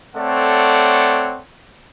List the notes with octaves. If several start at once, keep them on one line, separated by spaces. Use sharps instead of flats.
A3 C4 A4 C#5 D5 F#5